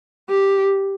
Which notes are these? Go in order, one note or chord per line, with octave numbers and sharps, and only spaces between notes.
G4